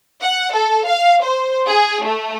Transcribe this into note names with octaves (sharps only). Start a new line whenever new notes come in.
F#5
A4
F5
C5
G#4
A3